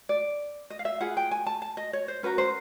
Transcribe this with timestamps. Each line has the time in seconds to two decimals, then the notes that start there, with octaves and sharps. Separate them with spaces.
0.09 D5
0.70 D#5
0.79 F5
0.85 E5
1.01 F4 G#4 B4 F#5
1.17 G5
1.31 G#5
1.47 A5
1.62 A5
1.77 D#5
1.93 C#5
2.08 C5
2.23 C#4 F#4 A#4 B4
2.38 C5